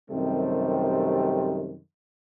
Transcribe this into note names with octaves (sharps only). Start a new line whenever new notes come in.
F#2 C3 D#3 G3 A3 C4